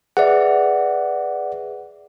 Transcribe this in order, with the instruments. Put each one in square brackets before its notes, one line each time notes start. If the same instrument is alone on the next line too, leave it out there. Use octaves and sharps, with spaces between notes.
[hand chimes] G#4 B4 E5 [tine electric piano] D5 F#5